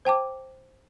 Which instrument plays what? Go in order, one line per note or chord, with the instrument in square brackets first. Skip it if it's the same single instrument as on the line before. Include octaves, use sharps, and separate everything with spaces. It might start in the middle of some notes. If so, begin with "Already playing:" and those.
[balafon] C5 G5 A5 D6